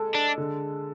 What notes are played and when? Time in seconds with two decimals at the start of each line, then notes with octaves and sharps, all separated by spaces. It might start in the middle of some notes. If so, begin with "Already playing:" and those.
Already playing: G#3 A4
0.15 D4
0.38 D3